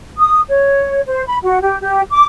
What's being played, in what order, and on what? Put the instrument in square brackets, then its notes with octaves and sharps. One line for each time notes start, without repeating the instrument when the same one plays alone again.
[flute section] D#6
C#5
C5
B5
F#4
G4
G4
D6